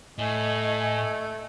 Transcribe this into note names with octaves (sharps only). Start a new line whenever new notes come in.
A2 A3 D#5 G#5